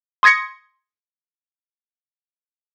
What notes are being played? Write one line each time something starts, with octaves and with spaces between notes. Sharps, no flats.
C6 D#6 G#6 A#6 C#7